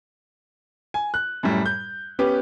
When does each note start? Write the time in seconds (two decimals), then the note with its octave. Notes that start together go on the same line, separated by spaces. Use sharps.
0.94 G#5
1.14 F#6
1.43 F#2 A2 G3
1.66 G6
2.19 B3 C#4 G4 B4